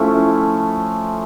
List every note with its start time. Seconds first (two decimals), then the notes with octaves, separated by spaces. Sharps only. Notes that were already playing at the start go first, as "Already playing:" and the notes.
Already playing: F3 A3 C#4 E4